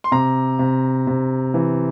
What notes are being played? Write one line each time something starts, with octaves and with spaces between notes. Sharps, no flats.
C6
C3 A#5
C3
C3
E3